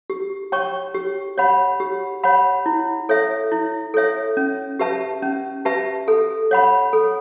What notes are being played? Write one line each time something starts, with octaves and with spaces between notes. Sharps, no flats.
G4
C#5 G5 C#6
G4
C#5 F#5 B5
G4
C#5 F#5 B5
E4
A4 C#5 E5
E4
A4 C#5 E5
C#4
G4 B4 E5 A5
C#4
G4 B4 E5 A5
A4
C#5 F#5 B5
A4